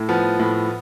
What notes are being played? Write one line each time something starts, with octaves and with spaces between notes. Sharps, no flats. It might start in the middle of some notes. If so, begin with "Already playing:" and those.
Already playing: A2
F3 B3
A2